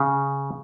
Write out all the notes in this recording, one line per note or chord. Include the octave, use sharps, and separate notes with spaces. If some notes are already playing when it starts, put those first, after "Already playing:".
Already playing: C#3